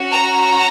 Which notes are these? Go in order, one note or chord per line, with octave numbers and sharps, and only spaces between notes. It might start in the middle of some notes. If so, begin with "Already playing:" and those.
Already playing: C#4 F#4
A#5